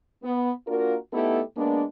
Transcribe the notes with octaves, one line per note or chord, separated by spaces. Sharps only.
B3
A#3 D4 F4 F#4 A#4
A3 B3 D#4 E4 G4 A4
G#3 A#3 B3 D4